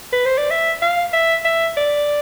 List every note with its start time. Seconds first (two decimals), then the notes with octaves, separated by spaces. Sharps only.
0.13 B4
0.26 C5
0.38 D5
0.51 E5
0.82 F5
1.13 E5
1.45 E5
1.77 D5